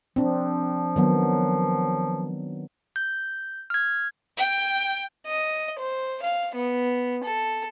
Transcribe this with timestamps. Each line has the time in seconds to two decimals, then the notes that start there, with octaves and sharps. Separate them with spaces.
0.16 F3 C4 D4
0.96 D#3 F#3 B3
2.96 G6
3.70 F6 G#6
4.37 G5
5.26 D#5
5.79 C5
6.22 F5
6.55 B3
7.24 A4